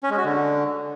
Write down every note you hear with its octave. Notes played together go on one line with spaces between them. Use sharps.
C#4
G#3
F#4
D3